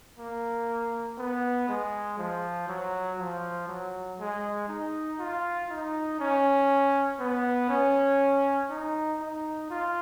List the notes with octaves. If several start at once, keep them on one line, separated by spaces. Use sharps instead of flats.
A#3
B3
G#3
F3
F#3
F3
F#3
G#3
D#4
F4
D#4
C#4
B3
C#4
D#4
D#4
F4